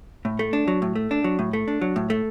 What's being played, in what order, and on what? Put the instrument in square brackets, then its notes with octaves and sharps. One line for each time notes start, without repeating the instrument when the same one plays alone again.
[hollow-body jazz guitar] A2
A3
D4
F#3
A2
A3
D4
F#3
A2
A3
D4
F#3
A2
A3